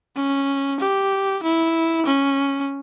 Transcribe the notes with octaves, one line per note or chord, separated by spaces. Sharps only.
C#4
G4
E4
C#4